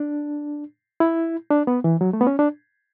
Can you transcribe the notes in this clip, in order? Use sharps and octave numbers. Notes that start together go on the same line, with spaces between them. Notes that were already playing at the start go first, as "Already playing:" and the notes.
Already playing: D4
E4
D4
B3
E3
F#3
A3
B3
C#4
D4